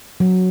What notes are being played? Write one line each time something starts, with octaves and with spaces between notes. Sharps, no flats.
F#3